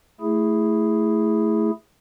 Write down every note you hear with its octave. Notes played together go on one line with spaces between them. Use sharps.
A3 E4 G#4